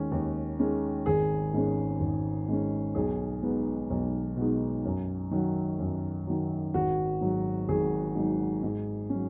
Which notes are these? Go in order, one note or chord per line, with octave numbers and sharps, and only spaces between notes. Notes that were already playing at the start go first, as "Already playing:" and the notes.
Already playing: D#2 D#3 G#3 C#4
D#2
D#3 G#3 C#4
G#1 G#4
G#2 G#3 C#4
G#1
G#2 G#3 C#4
B1 G#4
B2 G#3 B3 D#4
B1
B2 G#3 B3 D#4
F#2
D#3 F#3
F#2
D#3 F#3
G#1 F#4
G#2 F#3 D#4
G#1 G#4
G#2 F#3 D#4
G#2
F#3 C#4